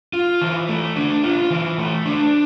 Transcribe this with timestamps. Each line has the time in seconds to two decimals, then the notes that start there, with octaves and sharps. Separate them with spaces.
0.13 F4
0.41 E3
0.68 A3
0.96 D4
1.24 F4
1.50 E3
1.78 A3
2.06 D4